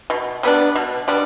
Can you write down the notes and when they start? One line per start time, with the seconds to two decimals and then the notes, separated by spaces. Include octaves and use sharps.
0.10 B2
0.43 G3 B3 D4
0.75 B2
1.08 G3 B3 D4